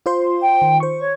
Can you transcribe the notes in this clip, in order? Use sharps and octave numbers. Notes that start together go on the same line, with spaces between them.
F4 C5 C6
G5
D#3
C5 C#6
C#5